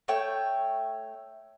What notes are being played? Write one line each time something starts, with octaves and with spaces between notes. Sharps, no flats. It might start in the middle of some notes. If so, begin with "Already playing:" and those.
A3 C#5 G5